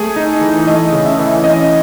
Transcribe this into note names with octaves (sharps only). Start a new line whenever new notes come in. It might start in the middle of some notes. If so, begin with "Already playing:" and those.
Already playing: A3 G#4
D#4
E3
A3 D#5
C#3
E5
E3
C#4 D#5